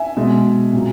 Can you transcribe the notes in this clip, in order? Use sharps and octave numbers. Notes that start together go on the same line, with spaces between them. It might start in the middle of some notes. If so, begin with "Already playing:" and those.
Already playing: E5 G#5
B2 G#3
A#2 F#3